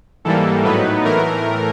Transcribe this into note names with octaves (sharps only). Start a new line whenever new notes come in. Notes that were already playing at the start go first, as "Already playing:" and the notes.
G#2 E3 G3 A#3 A4
A2 F#3 B3 D#4 B4
A2 E3 A3 A#4